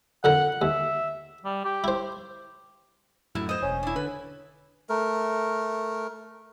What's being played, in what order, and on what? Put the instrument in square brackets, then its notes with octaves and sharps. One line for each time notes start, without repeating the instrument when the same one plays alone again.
[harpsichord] F2 D3 A#4 [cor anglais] F#5
[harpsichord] D#2 [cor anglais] E5
[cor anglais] G3
G4
[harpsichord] E4 C5
[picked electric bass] F#2 A2 [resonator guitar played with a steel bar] E4
[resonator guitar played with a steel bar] C5 D#5
[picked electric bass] E1 [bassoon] C#4
[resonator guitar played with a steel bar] D4 E4
[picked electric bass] D3 [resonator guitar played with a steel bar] B4
[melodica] A3 A#4